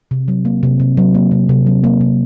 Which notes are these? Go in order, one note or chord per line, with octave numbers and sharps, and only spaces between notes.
C3
F#3
A#3
C3
C3
F#3
A#3
C3
C3
F#3
A#3
C3